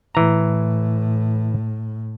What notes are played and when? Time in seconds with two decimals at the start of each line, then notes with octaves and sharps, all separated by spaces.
0.15 A2 E3 A#5